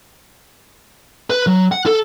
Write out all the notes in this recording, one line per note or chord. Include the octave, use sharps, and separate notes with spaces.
B4
F#3
F#5
A4